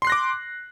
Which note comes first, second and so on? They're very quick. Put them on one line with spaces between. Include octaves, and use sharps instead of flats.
C6 C7 F#6 A#6 D6